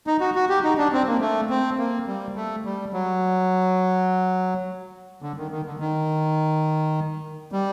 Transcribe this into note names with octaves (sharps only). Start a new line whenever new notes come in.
D#4
F#4
F#4
G4
D#4
D4
C4
A#3
A3
C4
A#3
G3
A3
G3
F#3
D3
D#3
D#3
D3
D#3
G3